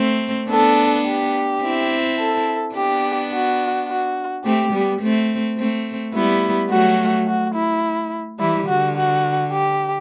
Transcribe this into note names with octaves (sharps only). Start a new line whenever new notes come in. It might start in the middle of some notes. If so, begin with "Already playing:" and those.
Already playing: A3 C4
B3 D4 A4
G4
C4 E4
A4
B3 D4 G4
F#4
F#4
A3 C4 G4
G3 B3
A3 C4
A3 C4
G3 B3 E4
F#3 A3 F#4
F#4
E4
E3 G3 E4
D3 F#4
F#4
G4